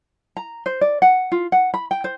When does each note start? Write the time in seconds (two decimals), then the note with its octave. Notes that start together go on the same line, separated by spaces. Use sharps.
0.37 A#5
0.66 C5
0.81 D5
1.02 F#5
1.32 F4
1.52 F#5
1.74 B5
1.91 G5
2.04 C5